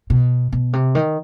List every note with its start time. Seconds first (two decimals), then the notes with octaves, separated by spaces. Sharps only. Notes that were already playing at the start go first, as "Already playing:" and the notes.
0.10 B2
0.52 B2
0.73 C3
0.95 D#3